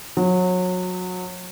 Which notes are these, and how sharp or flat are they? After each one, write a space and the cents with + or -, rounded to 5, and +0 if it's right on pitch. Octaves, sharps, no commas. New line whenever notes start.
F#3 -25